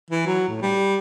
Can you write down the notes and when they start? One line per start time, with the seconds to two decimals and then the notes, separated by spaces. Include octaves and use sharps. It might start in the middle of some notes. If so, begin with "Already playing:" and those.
0.11 E3
0.26 F#3
0.49 A2
0.62 G3